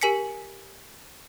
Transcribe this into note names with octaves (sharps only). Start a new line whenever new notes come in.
G4 A#4 G#5 B6 C#7